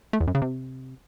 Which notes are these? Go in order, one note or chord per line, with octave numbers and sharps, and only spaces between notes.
A3
E2
F#2
C#3
C3